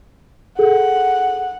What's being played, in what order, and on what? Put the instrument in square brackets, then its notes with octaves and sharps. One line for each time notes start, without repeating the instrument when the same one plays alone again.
[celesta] G#4 A4 [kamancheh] F#5